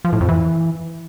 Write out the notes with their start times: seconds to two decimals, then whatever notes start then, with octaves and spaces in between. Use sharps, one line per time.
0.05 F3
0.13 A2
0.21 F2
0.29 E3